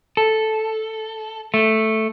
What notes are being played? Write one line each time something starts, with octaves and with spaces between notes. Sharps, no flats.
A4
A3